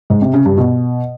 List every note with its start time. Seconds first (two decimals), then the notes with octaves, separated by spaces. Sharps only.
0.10 G#2
0.22 C3
0.34 C#3
0.45 G2
0.57 B2